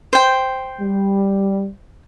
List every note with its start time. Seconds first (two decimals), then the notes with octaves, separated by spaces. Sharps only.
0.13 C5 G5
0.81 G3